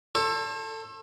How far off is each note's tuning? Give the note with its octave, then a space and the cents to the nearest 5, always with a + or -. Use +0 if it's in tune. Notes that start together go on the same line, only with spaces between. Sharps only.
A4 +15 C5 +45